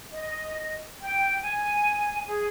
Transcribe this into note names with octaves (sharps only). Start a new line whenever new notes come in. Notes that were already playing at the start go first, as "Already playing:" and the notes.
D#5
G5
G#5
G#4